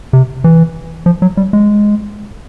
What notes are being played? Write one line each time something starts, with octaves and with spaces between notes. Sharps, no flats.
C3
E3
F3
F#3
G3
G#3